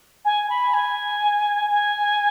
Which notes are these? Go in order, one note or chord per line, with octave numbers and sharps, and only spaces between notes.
G#5
B5
G#5
G#5